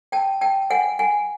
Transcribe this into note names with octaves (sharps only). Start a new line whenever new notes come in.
G5 A5
G5 A5
F#5 G#5
F#5 G#5